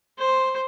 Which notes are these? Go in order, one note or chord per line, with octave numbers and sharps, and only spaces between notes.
C5